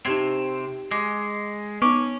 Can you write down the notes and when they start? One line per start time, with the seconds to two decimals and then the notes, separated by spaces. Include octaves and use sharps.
0.06 C3 C4 D#4 G4 G#6
0.91 G#3 D6
1.82 B3 C#4 D#4 C#6 D6